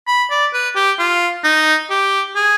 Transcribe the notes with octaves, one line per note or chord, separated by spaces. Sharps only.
B5
D5
B4
G4
F4
D#4
G4
G#4